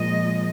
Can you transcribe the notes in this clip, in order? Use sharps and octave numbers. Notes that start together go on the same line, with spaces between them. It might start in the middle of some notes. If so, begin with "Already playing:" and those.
Already playing: A#2 F3 G#3 D#5